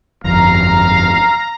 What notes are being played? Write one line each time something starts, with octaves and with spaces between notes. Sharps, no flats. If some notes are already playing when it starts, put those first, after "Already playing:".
G1 F2 F5 A#5